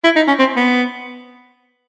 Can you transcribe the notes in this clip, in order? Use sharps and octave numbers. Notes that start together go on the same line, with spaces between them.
E4
D#4
C#4
C4
B3